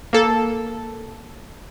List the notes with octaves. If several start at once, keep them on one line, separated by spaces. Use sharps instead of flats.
A#3 A4